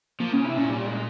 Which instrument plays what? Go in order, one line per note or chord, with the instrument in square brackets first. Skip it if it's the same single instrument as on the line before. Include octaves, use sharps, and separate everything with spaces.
[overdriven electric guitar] F3 [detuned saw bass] A#3
[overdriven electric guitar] C#3 [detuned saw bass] C#4
[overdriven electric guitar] C3 [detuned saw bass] E4
[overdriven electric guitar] A#2 [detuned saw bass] C#4
[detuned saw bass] G3
G#3